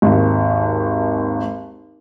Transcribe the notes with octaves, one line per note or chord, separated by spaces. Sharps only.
G#1 D#2